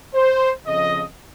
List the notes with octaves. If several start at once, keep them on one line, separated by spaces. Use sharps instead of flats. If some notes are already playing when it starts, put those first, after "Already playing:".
C5
F2 C#3 F3 D#5